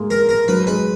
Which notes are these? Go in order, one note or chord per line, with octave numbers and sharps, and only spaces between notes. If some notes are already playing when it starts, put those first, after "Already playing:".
Already playing: G#3 A#3
A#4
A#4
F#3 B4
G#3 B4